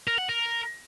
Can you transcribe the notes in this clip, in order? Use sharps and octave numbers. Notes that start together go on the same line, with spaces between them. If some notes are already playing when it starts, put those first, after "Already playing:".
A#4
F#5
A#4